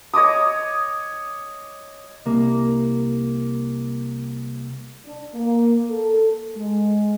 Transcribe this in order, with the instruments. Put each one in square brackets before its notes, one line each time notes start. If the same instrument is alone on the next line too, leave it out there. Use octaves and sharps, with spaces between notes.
[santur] C#5 D#5 D6 D#6
[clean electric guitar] C2 A#3
[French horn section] D4
A#3
A4
G#3